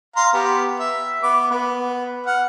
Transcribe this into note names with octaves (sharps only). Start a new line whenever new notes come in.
F5 A#5 C6
B3 G4
E5
B3 D6
B3
F#5 F6